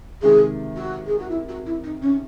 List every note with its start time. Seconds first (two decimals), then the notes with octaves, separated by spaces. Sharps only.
0.22 C3 D#3 G#3 G#4
0.76 F#4
1.07 G#4
1.19 F#4
1.30 E4
1.49 F#4
1.66 E4
1.84 D#4
2.02 C#4